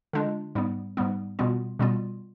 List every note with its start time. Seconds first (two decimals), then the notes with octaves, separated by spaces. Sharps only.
0.13 D3 G#3 D4 F4
0.55 G#2 G3 B3
0.97 G#2 G3 B3
1.39 B2 G3 B3 F4
1.79 B2 G3 B3 F4